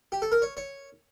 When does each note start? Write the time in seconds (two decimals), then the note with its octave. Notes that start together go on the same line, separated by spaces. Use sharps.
0.12 G4
0.22 A4
0.32 A#4
0.42 C#5
0.57 C#5